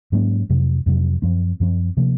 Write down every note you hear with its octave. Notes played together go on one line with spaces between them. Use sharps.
G#2 F#3 A#3 C#4
F2 C3 F#3
F2 C3 F#3
F#2 F3 C4
F#2 F3 C4
C3 F3 A#3